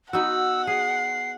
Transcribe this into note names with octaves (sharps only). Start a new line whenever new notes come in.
B3 D#4 F#4 F#5 E6
G#4 C7